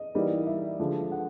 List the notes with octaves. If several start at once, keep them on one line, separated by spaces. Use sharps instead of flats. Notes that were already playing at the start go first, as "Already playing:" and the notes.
Already playing: D#5
E3 G3 A#3 D#4
E5
D3 F3 G#3
F#5